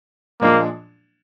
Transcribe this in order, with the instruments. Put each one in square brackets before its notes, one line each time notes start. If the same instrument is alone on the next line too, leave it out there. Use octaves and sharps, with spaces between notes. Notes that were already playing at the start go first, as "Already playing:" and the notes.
[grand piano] A#2 F3 G#3 D4 [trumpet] A#3